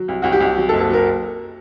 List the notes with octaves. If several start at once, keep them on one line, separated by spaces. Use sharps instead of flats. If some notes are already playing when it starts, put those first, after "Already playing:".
Already playing: F#3
C2
C2 F#4
G4
C2
F#3
A4
F#1
A4
F#3 A#4